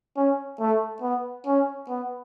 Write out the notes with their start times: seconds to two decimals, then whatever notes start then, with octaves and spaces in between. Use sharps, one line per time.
0.16 C#4
0.60 A3
1.02 B3
1.46 C#4
1.89 B3